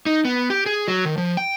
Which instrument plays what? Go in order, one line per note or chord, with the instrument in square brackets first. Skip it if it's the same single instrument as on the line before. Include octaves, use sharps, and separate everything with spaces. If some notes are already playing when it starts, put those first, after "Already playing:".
[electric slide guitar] D#4
B3
G4
G#4
F#3
D#3
F3
G5